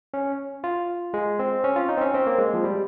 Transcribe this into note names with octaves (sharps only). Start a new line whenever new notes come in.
C#4
F4
G#3
C4
C#4
F4
D#4
C4
C#4
C4
A#3
G#3
F3
G3